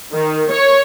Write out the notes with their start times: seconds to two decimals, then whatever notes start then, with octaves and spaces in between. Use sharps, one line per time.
0.12 D#3
0.50 C#5